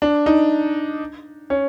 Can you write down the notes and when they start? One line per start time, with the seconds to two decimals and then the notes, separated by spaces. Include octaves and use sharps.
0.02 D4
0.26 D#4
1.50 C#4